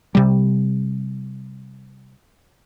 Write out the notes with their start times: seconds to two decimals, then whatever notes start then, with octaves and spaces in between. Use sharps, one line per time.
0.15 C3 G3